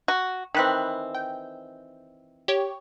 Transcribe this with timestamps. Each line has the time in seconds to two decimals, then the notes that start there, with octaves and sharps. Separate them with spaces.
0.08 F#4
0.54 D#3 E3 C4 B5 F#6
1.15 G5
2.48 G4 C#5